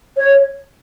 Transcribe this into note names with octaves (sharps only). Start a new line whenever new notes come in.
C#5